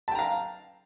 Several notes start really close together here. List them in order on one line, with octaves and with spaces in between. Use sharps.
A5 G5 A#5 F5